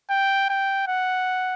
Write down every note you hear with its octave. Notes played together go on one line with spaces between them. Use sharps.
G5
G5
F#5